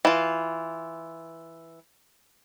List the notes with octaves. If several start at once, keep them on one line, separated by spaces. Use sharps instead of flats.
E3 F4